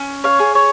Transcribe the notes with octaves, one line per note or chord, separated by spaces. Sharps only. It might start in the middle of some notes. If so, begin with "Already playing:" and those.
Already playing: C#4
C#5 F5
G#4
C#5